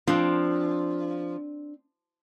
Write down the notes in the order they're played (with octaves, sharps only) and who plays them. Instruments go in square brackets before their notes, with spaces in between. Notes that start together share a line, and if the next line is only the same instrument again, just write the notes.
[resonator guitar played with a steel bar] F3 [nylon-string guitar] C4 D4